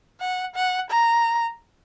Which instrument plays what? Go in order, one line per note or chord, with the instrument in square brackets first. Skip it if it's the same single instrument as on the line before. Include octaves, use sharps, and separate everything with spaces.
[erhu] F#5
F#5
A#5